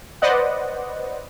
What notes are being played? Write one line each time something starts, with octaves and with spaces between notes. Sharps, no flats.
B4 C5 D5 D#5 F#5